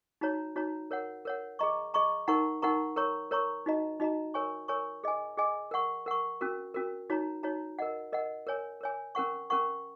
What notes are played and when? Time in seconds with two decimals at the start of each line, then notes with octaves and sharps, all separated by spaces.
0.21 D#4 F#4 C#5 A#5
0.56 D#4 F#4 C#5 A#5
0.91 A#4 C#5 F#5
1.25 A#4 C#5 F#5
1.59 G#4 D#5 A#5 C#6
1.94 G#4 D#5 A#5 C#6
2.28 D#4 A#4 F#5 A#5 C#6
2.62 D#4 A#4 F#5 A#5 C#6
2.96 A#4 C#5 A#5 C#6
3.31 A#4 C#5 A#5 C#6
3.66 D#4 F#4 D#5 A#5
4.00 D#4 F#4 D#5 A#5
4.34 A#4 C#5 G#5 C#6
4.68 A#4 C#5 G#5 C#6
5.04 G#4 D#5 G#5
5.37 G#4 D#5 G#5
5.71 A#4 F#5 C#6
6.06 A#4 F#5 C#6
6.41 C#4 F#4 A#4
6.74 C#4 F#4 A#4
7.10 D#4 F#4 C#5 A#5
7.43 D#4 F#4 C#5 A#5
7.79 A#4 D#5 F#5
8.13 A#4 D#5 F#5
8.47 A#4 C#5 G#5
8.81 A#4 C#5 G#5
9.15 C#4 A#4 F#5 C#6
9.50 C#4 A#4 F#5 C#6